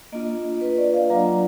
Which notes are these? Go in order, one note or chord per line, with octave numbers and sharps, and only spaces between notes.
A#3 D4 F4 D#5
B4
D5
F5
F#3 D4 F4 A#5
A#5